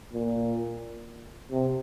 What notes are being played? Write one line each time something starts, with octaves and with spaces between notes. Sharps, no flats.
A#2
C3